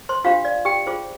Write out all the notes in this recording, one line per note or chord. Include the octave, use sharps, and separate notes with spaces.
C5 C6
D4 F4 G4 C5 F5
D5
G4 G5
F4 G#4 C5